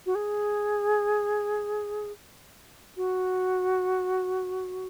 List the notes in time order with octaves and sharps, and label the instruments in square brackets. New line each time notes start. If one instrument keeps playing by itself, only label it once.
[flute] F#4
G#4
F#4